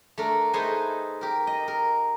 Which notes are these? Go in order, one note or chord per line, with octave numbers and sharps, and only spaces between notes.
A3 D4 A#4
A3 D#4 G#4 B4 C5 G#5
G4 A#4
D#5
A#4